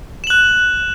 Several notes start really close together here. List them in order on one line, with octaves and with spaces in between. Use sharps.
E7 F#7 F#6